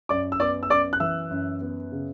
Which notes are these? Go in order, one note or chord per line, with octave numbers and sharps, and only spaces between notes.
F#2 D5 D6
E6
B3 D5 D6
E6
F#2 D5 D6
F#6
E3 E5 E6
F#2
B3
C#3